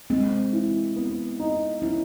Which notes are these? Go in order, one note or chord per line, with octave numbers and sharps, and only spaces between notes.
G#3 C4
E3
B3
D#4
E3 C#4